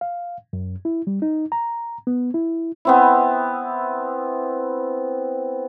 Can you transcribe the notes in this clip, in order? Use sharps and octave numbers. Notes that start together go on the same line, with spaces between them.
F5
F#2
E4
G3
D#4
A#5
B3
E4
B3 C4 E4